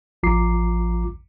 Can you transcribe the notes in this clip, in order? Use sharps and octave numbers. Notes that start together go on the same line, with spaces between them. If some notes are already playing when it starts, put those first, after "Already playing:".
A1 F3 F4 A#5 D6 C7